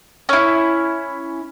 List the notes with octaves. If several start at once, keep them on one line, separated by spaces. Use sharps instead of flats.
C#4 E4